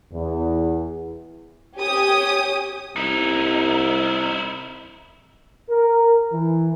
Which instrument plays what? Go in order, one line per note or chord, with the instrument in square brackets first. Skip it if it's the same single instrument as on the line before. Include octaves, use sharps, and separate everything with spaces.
[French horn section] E2
[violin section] G4 C#5 G#5 D#6
[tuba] C2 [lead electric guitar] D#4 E4
[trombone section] A#4
E3